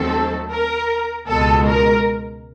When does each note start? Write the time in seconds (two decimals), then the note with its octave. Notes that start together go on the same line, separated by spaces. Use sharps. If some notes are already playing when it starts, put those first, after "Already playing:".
Already playing: D#2 D#3 F#3 A3 C4 A4
0.51 A#4
1.28 C#2 B2 G#3 A4
1.66 A#4